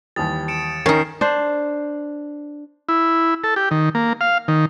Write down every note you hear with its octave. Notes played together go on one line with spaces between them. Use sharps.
D#2 E3 G3 D#6 A6
C#7 D7 E7
D#3 C#4 D#4 C7
D4 C5
E4
A4
G4
D#3
A#3
F5
D#3